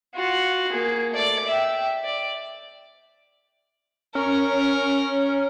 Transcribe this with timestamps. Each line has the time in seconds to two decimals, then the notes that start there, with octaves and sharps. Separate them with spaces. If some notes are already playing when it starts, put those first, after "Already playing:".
0.14 F4 F#4
0.72 A#3 G#4
1.12 A3 D5
1.48 E5 G5
2.04 D5
4.15 C#4 A#4